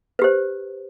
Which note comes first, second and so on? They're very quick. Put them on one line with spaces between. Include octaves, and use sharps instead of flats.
B4 G4 C5